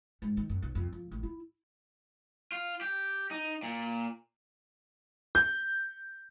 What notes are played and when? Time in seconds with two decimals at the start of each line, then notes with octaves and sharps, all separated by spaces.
0.22 G#2
0.37 D#3
0.50 F#2
0.62 B1
0.75 F2
0.92 F2
1.11 A1
1.23 E4
2.52 F4
2.81 G4
3.31 D#4
3.63 A#2
5.35 G6